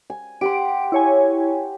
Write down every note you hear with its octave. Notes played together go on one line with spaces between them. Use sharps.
G#5
G4 F#5 C6 D7
E4 C#5 G#5